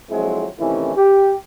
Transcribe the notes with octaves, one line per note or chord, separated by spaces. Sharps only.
A#1 F2 F#3 G#3 C4 E4
C3 D#3 E3 A3 C#4 E4
G4